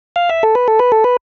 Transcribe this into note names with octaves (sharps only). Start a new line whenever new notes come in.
F5
E5
A4
B4
A4
B4
A4
B4